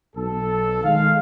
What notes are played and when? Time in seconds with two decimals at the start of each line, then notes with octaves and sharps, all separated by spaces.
0.16 B1 A4
0.84 D#3 G#3 F5